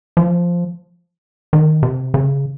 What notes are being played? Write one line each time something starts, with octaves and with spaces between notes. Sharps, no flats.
F3
D#3
C3
C#3